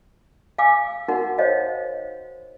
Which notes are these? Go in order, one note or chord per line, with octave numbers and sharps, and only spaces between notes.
F5 G#5 D6 E6
D#4 F#4 A#4 F#5
C5 C#5 D#5 F5